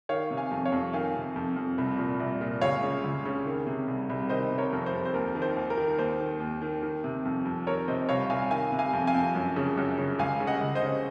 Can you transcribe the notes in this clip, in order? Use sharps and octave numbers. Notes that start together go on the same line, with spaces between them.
D#3 C#5 F5
C3
F5 G#5
F2
C#5 F5
F2
D#3 F5 G#5
C3
F2
F2
C2
A#2
C2
A#2
C#2 C#5 F5
C#3
C#2
C#3
D#3
C3
C2
C2
D#3 C5 D#5
C3
A#4 C#5
F2
C5
F2
C5
D#2 A#4
D#3
C5
D#2
A#4
D#3
D#2 C5
D#3
D#2
D#3
D#3
C3
F2
F2
D#3 A#4 C#5
C3 C5 D#5
C2 C#5 F5
C2 F5 G#5
D#3 F5 G#5
C3
F5 G#5
F2
F5 G#5
F2
F#2
C#3
F#2
C#3
C#2 F5 G#5
C#3
D#5 F#5
C#2
C5 D#5
C#3